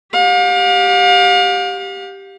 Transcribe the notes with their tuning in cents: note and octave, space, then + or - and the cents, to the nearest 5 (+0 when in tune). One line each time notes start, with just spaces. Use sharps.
G4 +0 F5 +40